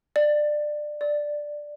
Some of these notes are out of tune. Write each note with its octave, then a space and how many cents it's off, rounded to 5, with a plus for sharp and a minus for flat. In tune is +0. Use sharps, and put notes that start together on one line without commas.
D5 +20
D5 +5